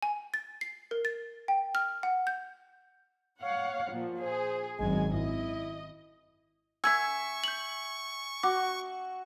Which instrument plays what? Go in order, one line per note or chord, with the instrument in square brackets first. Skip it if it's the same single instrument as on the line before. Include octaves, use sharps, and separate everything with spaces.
[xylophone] G#5
A6
C7
A#4
A6
G5
F6
F#5
G6
[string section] C#5 F5 F#5
A#2 F3
[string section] G#4 [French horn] C5
[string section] G#1 F#2 G#5 [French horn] G#3
[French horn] E4 [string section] D#5
[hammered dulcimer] E5 G#5 [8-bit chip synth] C#6 [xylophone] E6 G#6
[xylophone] G6 F#7
[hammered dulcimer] F#4 [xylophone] D6